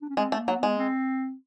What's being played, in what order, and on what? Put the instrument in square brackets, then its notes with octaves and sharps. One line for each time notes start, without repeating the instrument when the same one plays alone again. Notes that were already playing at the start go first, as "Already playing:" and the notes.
[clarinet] D4
C#4
[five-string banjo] G#3 [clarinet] C4
[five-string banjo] A3
[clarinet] A#3
[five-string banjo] F#3
[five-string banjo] G#3 [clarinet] B3
[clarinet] C4